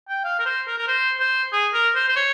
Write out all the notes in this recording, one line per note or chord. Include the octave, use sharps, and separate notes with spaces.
G5
F5
A#4
C5
A#4
A#4
C5
C5
G#4
A#4
C5
C5
C#5